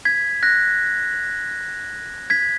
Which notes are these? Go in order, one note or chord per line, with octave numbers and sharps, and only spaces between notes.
G#6 B6
F#6 A#6
G#6 B6